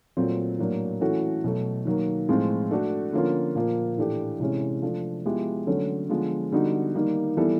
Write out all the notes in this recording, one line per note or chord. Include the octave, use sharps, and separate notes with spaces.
A#2 F#3 A3 C4
A2 F#3 A#3 D4
E3 A3 C#4 F#4 A4
B2 F#3 A3
D#3 F#3 A#3
A2 F3 G#3 C4 F4
A3 D4 F#4 A4
D3 F3 A#3 C#4 F4
A#2 F3 A#3
A2 E3 A3 D4 G4
C3 E3 G#3 C#4
F3 A3 D4
F3 G#3 B3 E4 G4
D3 F#3 A3 C#4
D3 F3 G#3 B3
D3 G3 B3 D#4 F#4
D#3 G3 A#3 D#4
E3 G3 B3 E4 A4